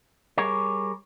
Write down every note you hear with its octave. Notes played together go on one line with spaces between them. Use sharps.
G3 G#4 A#4 C#5